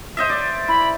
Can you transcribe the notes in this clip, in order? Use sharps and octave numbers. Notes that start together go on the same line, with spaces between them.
C5 D#5 E5
D5
E4 B5